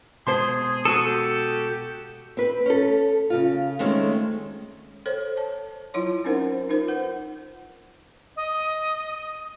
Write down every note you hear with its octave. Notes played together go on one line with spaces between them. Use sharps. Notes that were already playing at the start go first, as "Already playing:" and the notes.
B2 G#3 B3 G#4 C5 A5 C6
F#4 A4 D#6
G4
C4 B4
C#4 A4
C#3 F4
D#3 G#3 A3 C4 C#4
A4 C5 C#5
C#5 A5
F#3 E4 F4 C#5 C6
C4 C#4 D#4 A#4 C5 F#5
D#4 F4 A#4 C5
B4 F#5
D#5